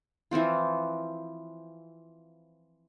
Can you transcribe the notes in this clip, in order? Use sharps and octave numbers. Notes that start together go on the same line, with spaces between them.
E3 F3 C4 F4